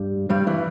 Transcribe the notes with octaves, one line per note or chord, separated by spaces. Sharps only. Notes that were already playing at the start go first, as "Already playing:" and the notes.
Already playing: G2 G3
G2 G3
E3